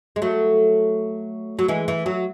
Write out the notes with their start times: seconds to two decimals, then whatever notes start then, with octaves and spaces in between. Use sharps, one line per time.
0.16 G#3
0.22 F#3 A3
1.59 F#3
1.68 E3 G#3
1.88 E3
2.06 F#3